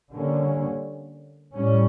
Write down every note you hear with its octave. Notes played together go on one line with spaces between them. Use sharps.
D3 G3 A#3 C#4
A2 G3 C#4